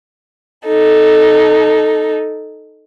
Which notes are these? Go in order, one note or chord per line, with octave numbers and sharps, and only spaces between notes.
D#4 A4